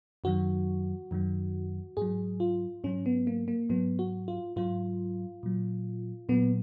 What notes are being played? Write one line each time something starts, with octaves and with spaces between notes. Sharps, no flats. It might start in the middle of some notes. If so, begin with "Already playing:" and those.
F#2 D#3 F#3 F#4
F#2 D#3 F#3
G#2 F#3 G#4
F4
G#2 F#3 C#4
B3
A#3
A#3
G#2 F#3 B3
F#4
F4
G#2 F#3 F4
A#2 F#3
A#2 F#3 B3